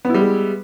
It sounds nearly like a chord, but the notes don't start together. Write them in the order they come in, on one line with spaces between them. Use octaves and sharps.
B3 E4 G3 G#3